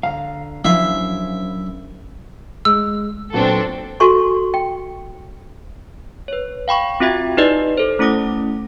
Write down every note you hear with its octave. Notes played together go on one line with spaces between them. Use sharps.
D3 F5 A#5
F#2 F3 D4 E4 E5 F5
G#3 E6
A#2 F#3 B3 C4 D4 A4
F#4 A4 G#5 C6 C#6
G5
B4 C#5
F5 G5 B5 C#6
C4 F4 F#4 E5 G5 G#6
D#4 E4 G4 B4 D5 D#5
A4 C5
A3 C#4 E4 D6 D#6 A#6